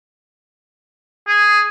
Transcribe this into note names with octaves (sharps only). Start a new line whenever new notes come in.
G#4